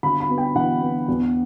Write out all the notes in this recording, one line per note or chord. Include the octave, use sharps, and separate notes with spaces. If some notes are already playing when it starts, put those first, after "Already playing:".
G1 B5
B5
B3
G5
E3 F#5
B3
E2